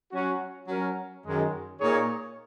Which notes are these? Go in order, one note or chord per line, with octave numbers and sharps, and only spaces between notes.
F#3 C#4 F#4
F#3 C#4 A#4
F#2 D#3 G#3
A#2 A#3 D#4 G#4 C#5